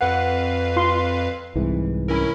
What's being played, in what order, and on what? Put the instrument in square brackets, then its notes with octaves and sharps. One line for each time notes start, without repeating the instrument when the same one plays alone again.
[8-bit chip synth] F2 B4 F5 [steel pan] F#5
[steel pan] F4 C6
[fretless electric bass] C2 G#2 E3
[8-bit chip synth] C#4 E4 A#4